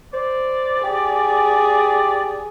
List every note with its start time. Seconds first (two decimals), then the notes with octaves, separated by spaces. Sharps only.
0.13 C5 D5
0.84 G4 G#4